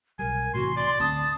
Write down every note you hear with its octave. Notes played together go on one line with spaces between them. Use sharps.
B1 G3 A#4 G#5
A2 C3 E3 F#4 C6
D5 C6
D2 C4 A5 D#6